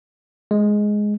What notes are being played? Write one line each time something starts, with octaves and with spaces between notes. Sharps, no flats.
G#3